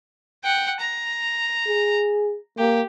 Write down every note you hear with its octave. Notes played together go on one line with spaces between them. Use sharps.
F#5 G5
A#5
G#4
A#3 G4